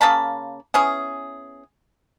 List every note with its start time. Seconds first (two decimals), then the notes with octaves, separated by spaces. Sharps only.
0.01 C#3 A#3 A5 B5
0.74 B3 C#4 E4 G#4